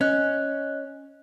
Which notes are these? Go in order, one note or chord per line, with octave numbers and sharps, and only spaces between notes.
C#4 D#5 F#6